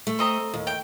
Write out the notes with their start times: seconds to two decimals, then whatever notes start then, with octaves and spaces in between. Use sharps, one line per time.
0.07 A3
0.19 C4 D#5 A#5
0.54 D#2
0.67 G5